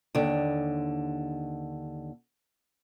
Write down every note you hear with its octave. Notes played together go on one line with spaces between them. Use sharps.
D#2 D3